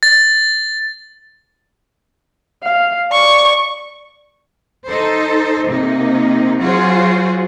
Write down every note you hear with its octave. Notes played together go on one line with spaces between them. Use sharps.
A6
F5
D5 C#6
D#4 A4 C5
C3 A#3 D#4
F#3 F4 F#4 G#4 C5